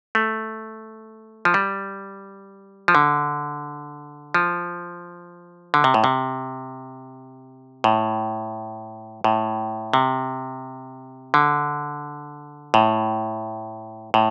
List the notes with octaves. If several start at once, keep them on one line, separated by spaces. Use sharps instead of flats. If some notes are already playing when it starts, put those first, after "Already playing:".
A3
F3
G3
F3
D3
F3
D3
C3
A2
C3
A2
A2
C3
D3
A2
A2